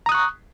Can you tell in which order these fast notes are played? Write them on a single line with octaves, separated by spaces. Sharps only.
A#5 D#6 F#6 C#6